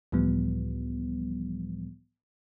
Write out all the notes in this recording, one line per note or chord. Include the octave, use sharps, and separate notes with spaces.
C#2 A2 E3 F3 G3 B3